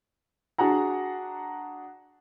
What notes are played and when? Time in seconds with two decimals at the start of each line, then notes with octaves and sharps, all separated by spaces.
0.58 D4 F#4 G#4 F#5 A#5